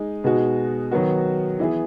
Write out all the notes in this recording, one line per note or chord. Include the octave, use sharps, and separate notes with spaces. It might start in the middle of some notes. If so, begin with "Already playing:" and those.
Already playing: G#3 D#4
B2 G#3 D#4 F#4
D#3 F#3 B3 F#4
E3 B3 E4 G#4